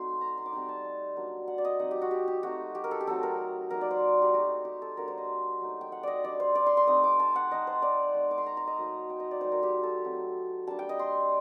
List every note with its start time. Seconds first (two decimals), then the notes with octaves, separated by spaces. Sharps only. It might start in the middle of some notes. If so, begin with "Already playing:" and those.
Already playing: F#3 A3 C4 D#4 C6
0.21 A#5
0.38 C6
0.46 D6
0.52 G3 C4 D#4 C6
0.69 A5
0.84 A5
1.16 F#3 A#3 D4
1.47 F#5
1.58 D5
1.65 D#5
1.80 F#3 C4 D#4 F#5
1.91 G4
2.02 F#4
2.11 G4
2.28 G4
2.43 A3 C4 D#4 F#4
2.75 G4
2.84 A#4
2.91 A4
3.01 G4
3.07 F#3 A3 C4 D#4 A4
3.23 A#4
3.70 F#3 A#3 D#4 A#4
3.81 D5
3.91 C5
4.22 G4
4.34 A3 D#4 F#4
4.65 G4
4.82 A4
4.97 F#3 A#3 D4 A#4
5.08 C5
5.18 D#5
5.61 F#3 A3 D#4
5.81 G5
5.92 F#5
6.03 D5 D#5
6.24 G3 D4 D5
6.40 C5
6.55 D5
6.66 C6
6.77 C6
6.87 A3 C4 D#4 D#6
7.04 D6
7.19 A5
7.36 F#5
7.51 A3 D#4 D#5
7.67 C5
7.82 D5
8.14 A3 D#4
8.31 D6
8.38 C6
8.46 A#5
8.57 A#5
8.67 D#5
8.78 F#3 A#3 D#4
9.10 G5
9.20 D#5
9.31 D5
9.41 F#3 A3 D#4 C5
9.52 A#4
9.63 G4
9.83 A4
10.04 F#3 A3 C4
10.67 G3 A#3 D4 A5
10.79 G5
10.89 D#5
10.99 C6